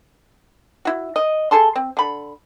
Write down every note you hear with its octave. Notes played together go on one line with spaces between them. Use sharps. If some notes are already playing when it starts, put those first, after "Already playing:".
E4 F#4
D#5
G#4 A4 A5 C6
C4
D3 B5